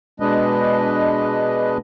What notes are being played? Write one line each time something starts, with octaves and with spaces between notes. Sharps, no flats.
B2 G#3 D4 B4 D#5